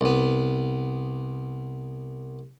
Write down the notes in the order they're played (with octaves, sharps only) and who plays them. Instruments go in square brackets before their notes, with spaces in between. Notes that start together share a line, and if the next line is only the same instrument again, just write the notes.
[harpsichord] C2 B3